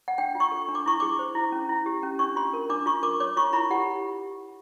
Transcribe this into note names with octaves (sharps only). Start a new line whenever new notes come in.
F#5
D4 G5
F4
C#6
A4
D4
D6
E4 C#6
G#4 D6
C5
E4
C#4
E4
G4
C#4
D4 C#6
F4 C6
A#4
D4 D6
F4 C#6
A#4 D6
C#5 D6
F4 C#6
E4 B5
G4 F#5